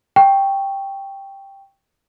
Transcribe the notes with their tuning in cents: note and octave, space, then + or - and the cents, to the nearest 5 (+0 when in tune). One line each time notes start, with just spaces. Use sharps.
G5 +0 C#6 +0